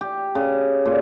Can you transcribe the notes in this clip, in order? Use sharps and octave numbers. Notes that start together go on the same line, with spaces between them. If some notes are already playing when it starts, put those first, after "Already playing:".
G4
C#3
A#2